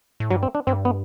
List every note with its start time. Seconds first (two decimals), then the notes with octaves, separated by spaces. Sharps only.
0.20 A2
0.30 G2 F#3
0.43 C4
0.55 D4
0.67 G2 C4
0.85 B3